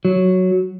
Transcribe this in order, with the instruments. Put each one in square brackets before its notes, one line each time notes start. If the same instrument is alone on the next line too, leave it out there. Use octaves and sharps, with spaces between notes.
[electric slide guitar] F#3